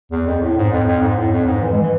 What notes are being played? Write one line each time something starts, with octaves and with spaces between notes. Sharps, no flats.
E2
F2
A2
G#2
F2
F2
G#2
A2
F2
G#2
E3
G#3
E3